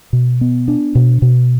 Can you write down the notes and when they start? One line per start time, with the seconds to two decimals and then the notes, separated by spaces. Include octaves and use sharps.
0.13 B2
0.41 B3
0.68 D4
0.95 B2
1.22 B2